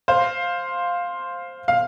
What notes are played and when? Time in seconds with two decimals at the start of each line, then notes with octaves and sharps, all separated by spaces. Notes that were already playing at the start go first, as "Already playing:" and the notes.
0.08 C5 F5
1.68 F5